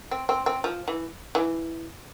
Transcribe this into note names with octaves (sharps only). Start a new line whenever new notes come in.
C4
C4
C4
F3
E3
E3